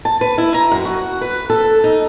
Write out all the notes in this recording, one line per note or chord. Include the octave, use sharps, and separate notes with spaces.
A5
B4
E4
A#5
F#2
F#4
B4
A4
D#4